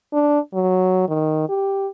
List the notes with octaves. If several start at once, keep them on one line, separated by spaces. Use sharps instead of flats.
D4
F#3
D#3
G4